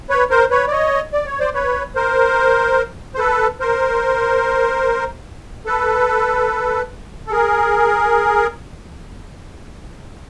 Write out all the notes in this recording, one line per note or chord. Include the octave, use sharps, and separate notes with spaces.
B4 C#5
A#4 C5
B4 C#5
D5
C#5 D#5
D5
C#5
C5 D5
B4 C#5
A#4 C5
C5
A4 B4
A#4 C5
A4 B4
A4
G#4 A#4